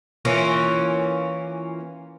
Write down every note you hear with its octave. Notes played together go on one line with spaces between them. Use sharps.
E3 A#3 C#4 F4